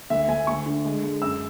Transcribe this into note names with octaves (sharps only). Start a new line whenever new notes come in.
D2 E5
D2 G#5
D2 C#6
D3
G#3
G#3
F#2 E6